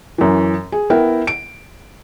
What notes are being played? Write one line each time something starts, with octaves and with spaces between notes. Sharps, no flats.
F#2 E3
G#4
B3 E4 A#4 G5
D7